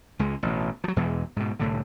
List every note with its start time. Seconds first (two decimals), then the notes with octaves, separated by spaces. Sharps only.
0.19 C#2 G#3
0.43 A1 B2
0.84 F3 F#3
0.96 E2 B2 E3 G#3
1.36 G#2 B2
1.60 C2 A2 D3